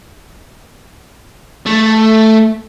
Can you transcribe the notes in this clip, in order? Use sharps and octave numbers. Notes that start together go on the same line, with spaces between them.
A3